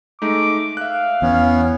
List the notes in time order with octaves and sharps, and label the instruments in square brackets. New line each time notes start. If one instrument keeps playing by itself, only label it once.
[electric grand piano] G#3 A3 D#4 [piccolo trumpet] D6
[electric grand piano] E5 F#6 [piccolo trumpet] F5
[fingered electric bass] E2 [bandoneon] B3 C#4